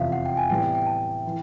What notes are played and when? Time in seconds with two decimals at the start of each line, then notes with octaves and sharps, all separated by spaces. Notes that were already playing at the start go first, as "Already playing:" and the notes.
Already playing: F1 E2 C3 F3 E5 F5
0.12 F#5
0.26 G5
0.37 G#5
0.50 A2 E3 G3 B3 E4 G5
0.75 G5
0.86 A5
1.27 E3